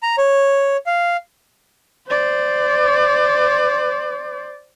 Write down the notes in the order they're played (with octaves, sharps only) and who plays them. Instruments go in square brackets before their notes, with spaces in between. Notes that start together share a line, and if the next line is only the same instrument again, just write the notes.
[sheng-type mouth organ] A#5
C#5
F5
[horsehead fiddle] C5 D5